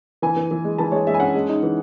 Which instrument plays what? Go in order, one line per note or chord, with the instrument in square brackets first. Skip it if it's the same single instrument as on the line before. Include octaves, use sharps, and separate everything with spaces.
[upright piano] E3 G#5
E3
E3
G#3
E3 A5
G#3 C#5
G#3 E5
G#5
C#4 F#5
G#3
D#4
E3